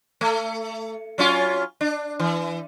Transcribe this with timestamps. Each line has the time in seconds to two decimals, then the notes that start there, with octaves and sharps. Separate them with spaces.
0.21 A3
1.18 F#3 C#4 F4
1.81 D4
2.19 E3